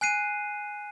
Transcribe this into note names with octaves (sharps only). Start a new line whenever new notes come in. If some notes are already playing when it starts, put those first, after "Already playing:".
G#5 F#6 C7 D#7